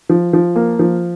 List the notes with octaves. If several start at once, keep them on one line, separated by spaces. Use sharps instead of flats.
F3
F3
A#3
F3